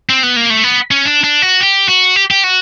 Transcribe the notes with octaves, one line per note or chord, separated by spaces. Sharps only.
C4
B3
A#3
A3
B3
C#4
D4
D4
F#4
G4
F#4
G4
G4
F#4